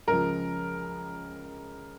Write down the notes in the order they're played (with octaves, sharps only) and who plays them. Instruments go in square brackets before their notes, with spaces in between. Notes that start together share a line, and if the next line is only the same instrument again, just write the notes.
[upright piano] C#2 C#3 F3 A#4